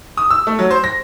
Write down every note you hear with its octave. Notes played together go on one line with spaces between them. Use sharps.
D#6
E6
A3
F#3
C5
A#6